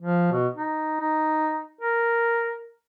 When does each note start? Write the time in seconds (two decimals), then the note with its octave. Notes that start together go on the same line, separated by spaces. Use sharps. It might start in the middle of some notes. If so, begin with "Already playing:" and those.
0.01 F3
0.32 B2
0.56 D#4
1.00 D#4
1.81 A#4